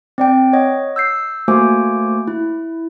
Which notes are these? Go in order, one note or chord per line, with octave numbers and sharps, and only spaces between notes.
C4 D5 G5
C#5 D#5 F#5
E6 G6 C7
A3 A#3 F#4 C5 G#5 D6
E4